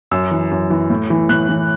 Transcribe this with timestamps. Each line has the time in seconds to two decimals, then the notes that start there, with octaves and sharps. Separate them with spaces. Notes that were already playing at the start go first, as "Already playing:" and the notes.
0.11 F#2 E6
0.31 E3
0.51 F#2
0.70 E3
0.90 A2
1.10 E3
1.29 A2 F#6
1.49 E3